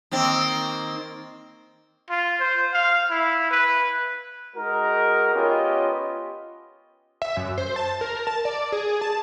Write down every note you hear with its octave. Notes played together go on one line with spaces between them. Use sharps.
D#3 A#3 C4
F4
C5
F5
E4
B4
G#3 D#4 F#4 A#4
B3 C#4 F4 G4 C#5 D#5
E5
F#2
C5
A5
A#4
A5
D5
G#4
A5